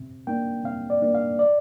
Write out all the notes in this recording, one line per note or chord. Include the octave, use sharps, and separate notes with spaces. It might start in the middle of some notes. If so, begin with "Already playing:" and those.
Already playing: C3
A#3 D4 G5
C3 F5
D5
A#3 D4
F5
D5